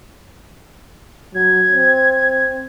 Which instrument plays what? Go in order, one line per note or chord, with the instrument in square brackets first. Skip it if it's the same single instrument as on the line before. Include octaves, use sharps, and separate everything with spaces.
[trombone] F#3 [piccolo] G#6
[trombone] C4